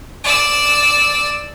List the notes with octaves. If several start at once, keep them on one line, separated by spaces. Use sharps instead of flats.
D5 E6